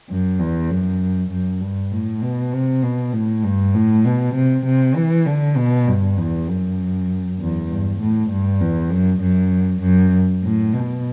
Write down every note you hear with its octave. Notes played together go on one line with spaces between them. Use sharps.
F#2
E2
F#2
F#2
G2
A2
B2
C3
B2
A2
G2
A2
B2
C3
C3
E3
D3
B2
G2
E2
F#2
E2
G2
A2
G2
E2
F#2
F#2
F#2
A2
B2